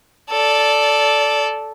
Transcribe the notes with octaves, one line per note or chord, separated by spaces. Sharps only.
A4 D5